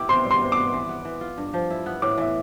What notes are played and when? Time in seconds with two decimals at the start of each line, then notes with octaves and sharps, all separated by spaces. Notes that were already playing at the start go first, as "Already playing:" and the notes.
Already playing: E4 G4 D6
0.09 C3 C6
0.25 G3
0.31 C6
0.42 C3
0.52 B3 D6
0.73 E3
0.89 B3
1.05 E3
1.21 F4
1.38 G2
1.54 F3
1.70 E4
1.86 B3
2.02 A2 D6
2.18 E3 E5